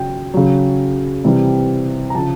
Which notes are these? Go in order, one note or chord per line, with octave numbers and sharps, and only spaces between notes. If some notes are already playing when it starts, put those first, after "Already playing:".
Already playing: C#3 F#3 G5
C#3 F#3
C3 E3 G3
A#5
C#3 F3 A5